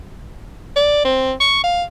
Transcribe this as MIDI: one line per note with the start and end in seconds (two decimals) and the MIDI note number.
0.76 1.01 74
1.05 1.33 60
1.40 1.62 85
1.64 1.84 77